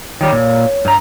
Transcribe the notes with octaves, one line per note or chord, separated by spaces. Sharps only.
D#3 G3 C#5
A#2
G2 A#5